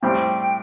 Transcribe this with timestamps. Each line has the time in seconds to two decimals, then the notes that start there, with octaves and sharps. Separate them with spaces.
0.03 A2 G3 C4 G5